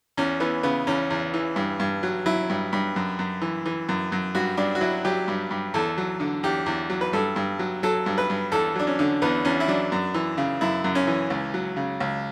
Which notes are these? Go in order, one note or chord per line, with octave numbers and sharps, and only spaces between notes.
E2 C#4
E3 B3
C#3 B3
E2 C#4
E2
E3
G2
G2
F#3
F#3 E4
G2
G2
F#2
F#2
E3
E3
F#2
F#2
G2 F#4
G2 D4
F#4
F#3 E4
F#3 G4
G2
G2
E2 A4
F#3
D3
E2 G4
E2
F#3
B4
G2 A4
G2
F#3
F#3 A4
G2
B4
G2
E2 A4
F#3 D4
C#4
D3
E2 B3
E2 C#4
E4
F#3 D4
F#2
E3
C#3
F#2 E4
F#2
C#4
E3
C#2
F#3
C#3
C#2